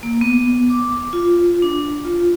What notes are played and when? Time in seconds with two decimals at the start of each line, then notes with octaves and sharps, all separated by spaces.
0.03 A#3
0.21 B3
0.70 D6
1.13 F4
1.62 D4
2.05 F4